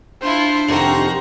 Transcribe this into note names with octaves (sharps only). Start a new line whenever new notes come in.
D4 E4 F4 C5
F2 C3 D#3 F#4 A#5